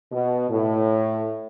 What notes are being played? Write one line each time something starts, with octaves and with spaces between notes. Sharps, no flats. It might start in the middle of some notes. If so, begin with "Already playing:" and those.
B2
A2